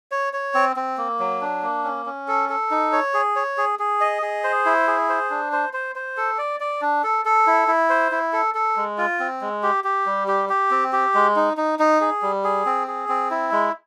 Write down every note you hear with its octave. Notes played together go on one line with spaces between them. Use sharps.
C#5
C#5
C4
C4
A#3
F#3
D4
A#3
C#4
C#4
A4
A4
D#4
C#5
G#4
C#5
G#4
G#4
D#5
G#4
C5
E4
G#4
C5
D4
C5
C5
C5
A4
D5
D5
D4
A4
A4
E4
E4
C5
E4
A4
A4
G#3
F4
C4
G#3
G4
G4
G3
G4
G4
C4
G4
G#3
D#4
D#4
D#4
G#4
G3
G#4
C4
G#4
C4
E4
G#3